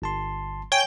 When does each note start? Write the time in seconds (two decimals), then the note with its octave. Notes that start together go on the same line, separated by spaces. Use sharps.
0.02 G1 A5 C6
0.72 C#5 G5 G#5 G6